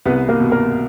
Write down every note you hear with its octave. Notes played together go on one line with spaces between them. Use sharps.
C2 B3 B4
A#3 A#4
B2
A#3 A#4